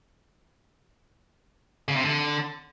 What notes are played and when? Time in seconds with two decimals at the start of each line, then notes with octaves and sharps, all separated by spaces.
1.88 C#3
1.96 C3
2.04 D3